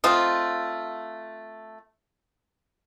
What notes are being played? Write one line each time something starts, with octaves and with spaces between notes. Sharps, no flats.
A3 C4 F4 D#5